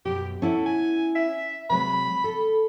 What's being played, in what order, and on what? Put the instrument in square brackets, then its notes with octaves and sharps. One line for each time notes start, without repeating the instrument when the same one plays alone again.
[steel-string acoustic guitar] F#2 B2 [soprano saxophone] G4
[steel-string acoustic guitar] C#4 E4 F#5 [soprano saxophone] A4
[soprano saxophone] G#5
E5
[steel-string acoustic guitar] C3 F#3 G#3 [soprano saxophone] B5
[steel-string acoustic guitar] A4